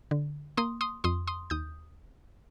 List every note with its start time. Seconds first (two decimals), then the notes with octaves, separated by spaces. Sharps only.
0.11 D3
0.57 A#3 C6 D#6
0.81 C6 D#6
1.04 F2 C6 D#6
1.27 C6 D#6
1.50 D#2 D#6 G6